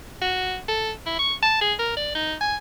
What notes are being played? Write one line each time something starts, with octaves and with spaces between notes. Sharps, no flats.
F#4
A4
E4
C#6
A5
G#4
A#4
D5
D#4
G#5